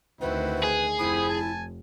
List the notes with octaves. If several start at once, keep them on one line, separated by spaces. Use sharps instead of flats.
D2 D#3 C4 E4 F#4 B4
G#4
F1 C4 E4 B5 D#6
G#5 A5